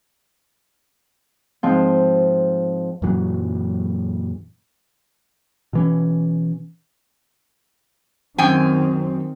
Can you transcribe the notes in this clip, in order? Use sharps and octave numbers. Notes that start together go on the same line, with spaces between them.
G#2 F3 C4
F#2 A#2 E3 F#3
B2 E3 C#4
F#2 D#3 C4 G5 G#5